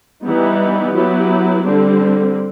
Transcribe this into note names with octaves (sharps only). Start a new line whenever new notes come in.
E3 G3 B3 D#4
F#3 B3 E4 G4
D3 G3 C4